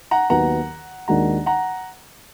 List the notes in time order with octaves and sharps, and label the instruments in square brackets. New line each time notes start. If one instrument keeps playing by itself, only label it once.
[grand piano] F#5 A#5
[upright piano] D#2 D#3 F#3 B3 [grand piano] F#5 A#5
[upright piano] D#2 D#3 G#3 D4 F#4 [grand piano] F#5 A#5
[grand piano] F#5 A#5